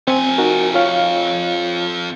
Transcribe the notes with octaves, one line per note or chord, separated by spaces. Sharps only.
F2 C4 G#5
D#4 F#4 A#4
F4 C#5 F5